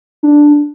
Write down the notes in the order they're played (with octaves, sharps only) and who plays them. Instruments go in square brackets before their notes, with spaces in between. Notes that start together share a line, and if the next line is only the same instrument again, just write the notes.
[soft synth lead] D4